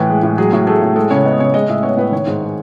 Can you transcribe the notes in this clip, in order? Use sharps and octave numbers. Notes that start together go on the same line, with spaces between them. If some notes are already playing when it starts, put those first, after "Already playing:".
Already playing: A2 E3 B4
G#3
A2
F#3 G#4
A2
A3 G#4
A2
G#3 A4
C#3 C#5
B3 D#5
C#3 C#5
G#3 D#5
A2 E5
B3 C#5
A2 B4
D#3 C#5
G#2
G#3